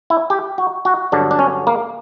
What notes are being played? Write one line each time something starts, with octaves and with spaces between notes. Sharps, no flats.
E4
G4
F#4
F#4
G2 D3 F#3 D4
D4
C#4
A#3